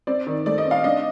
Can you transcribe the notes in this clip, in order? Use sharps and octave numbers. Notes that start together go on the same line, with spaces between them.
C4 D5
D#3
A3 D5
D#5
C4
F5
D4 D#5